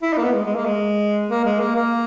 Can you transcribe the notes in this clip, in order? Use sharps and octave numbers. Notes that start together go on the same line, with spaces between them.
E4
D#4
A#3
B3
G#3
G#3
A#3
G#3
A#3
G#3
A#3
A#3